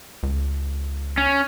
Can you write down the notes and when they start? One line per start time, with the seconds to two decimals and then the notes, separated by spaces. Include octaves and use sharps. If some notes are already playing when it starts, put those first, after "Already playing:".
0.23 C#2
1.17 C#4